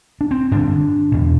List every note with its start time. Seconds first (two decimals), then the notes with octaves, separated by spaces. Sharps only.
0.21 D4
0.31 C4
0.51 G2 D3 D4
1.12 E2 B2